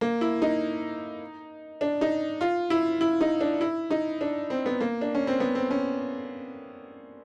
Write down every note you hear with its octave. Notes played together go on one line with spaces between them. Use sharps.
A#3
E4
D#4
D4
D#4
F4
E4
E4
D#4
D4
E4
D#4
D4
C4
B3
A#3
D4
C#4
C4
B3
C4
C#4